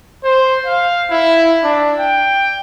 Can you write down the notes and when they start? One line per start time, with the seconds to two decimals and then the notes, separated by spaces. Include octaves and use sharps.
0.24 C5
0.66 F5
1.11 E4
1.63 D4
1.99 G5